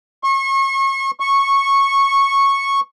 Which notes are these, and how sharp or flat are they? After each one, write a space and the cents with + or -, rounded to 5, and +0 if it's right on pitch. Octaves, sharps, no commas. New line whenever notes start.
C#6 -35
C#6 -10